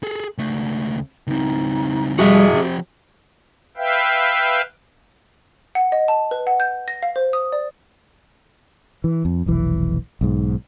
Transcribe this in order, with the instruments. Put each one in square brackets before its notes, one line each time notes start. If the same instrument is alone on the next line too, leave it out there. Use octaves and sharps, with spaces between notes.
[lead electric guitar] G#4 A4
C#2 A3
[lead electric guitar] C#2 C4 [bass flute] D#4
[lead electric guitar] F2 [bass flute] G3 [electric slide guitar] F#4 G#4 E5
[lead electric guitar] F3 G4 [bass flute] C4
[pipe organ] B4 E5 F5 G5
[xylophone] F#5
D#5
A5
B4
F#5
G6
A#6
F5
C5
D#6
D5
[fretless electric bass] E3
F2
F1 B1 E3
B1 G#2